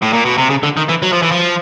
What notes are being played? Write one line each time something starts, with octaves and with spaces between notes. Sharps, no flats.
A2
A#2
B2
C3
C#3
D3
D#3
E3
F#3
F3
E3
F3